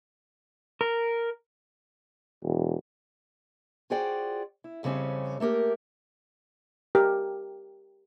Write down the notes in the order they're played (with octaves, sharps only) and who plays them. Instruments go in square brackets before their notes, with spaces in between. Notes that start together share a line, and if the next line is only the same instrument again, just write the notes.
[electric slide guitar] A#4
[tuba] E1
[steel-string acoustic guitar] F4 F#4 G#4 C5 D5 G5
E4
F2 C#3 G3 C4 C#4
A3 A#3 G4 A#4
[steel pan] G4 A#4